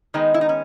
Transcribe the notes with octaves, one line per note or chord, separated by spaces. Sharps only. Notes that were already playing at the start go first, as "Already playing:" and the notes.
D#3 G#3 B3 D#4
E4
D#4
C#4